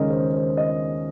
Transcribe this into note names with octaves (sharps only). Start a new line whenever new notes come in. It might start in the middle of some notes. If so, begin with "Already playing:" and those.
Already playing: D#2 C#3 G#3 C#4 A#4 D#5
C5
C5
D#5